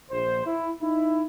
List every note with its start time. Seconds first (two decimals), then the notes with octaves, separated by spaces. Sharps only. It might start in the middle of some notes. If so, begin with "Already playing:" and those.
0.11 A#1 C5
0.45 E4
0.81 D#4 E4